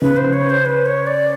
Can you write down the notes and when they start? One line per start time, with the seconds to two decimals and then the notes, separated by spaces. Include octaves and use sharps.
0.02 C#3 B4
0.17 C5
0.33 C#5
0.50 C5
0.65 B4
0.86 C#5
1.07 D5